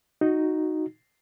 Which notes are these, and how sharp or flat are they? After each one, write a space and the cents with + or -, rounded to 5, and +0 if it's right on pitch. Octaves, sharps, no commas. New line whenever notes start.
D#4 +0 F#4 +0